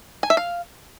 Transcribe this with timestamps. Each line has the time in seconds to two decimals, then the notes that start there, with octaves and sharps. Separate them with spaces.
0.23 G#5
0.30 E5
0.37 F5